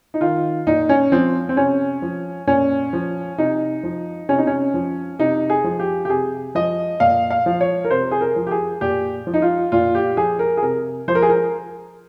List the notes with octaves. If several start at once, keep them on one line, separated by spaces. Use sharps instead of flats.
D#4
D#3 F4
A#2 D#4
C#4
F3 C4
C4
C3 C#4
F3
A#2 C#4
F3
C3 D#4
F3
C3 C#4
D#4
C#4
F3
C3 D#4
G#4
F3
G4
G4
C3 G#4
F3 D#5
A#2 F5
F5
F3
C#5
A#4
C3 C5
G#4
A#4
F3
G4
G#4
A#2 G4
F3
D#4
F4
A#2 F4
G4
F3 G#4
A#4
G#4
C3 A#4
F3 C5
A#4
G#4
A#4